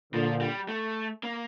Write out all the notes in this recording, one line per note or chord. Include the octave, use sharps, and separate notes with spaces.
A#2 D3 F3
G3
A3
A#3